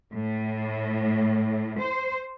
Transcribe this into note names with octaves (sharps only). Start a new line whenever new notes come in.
A2
C5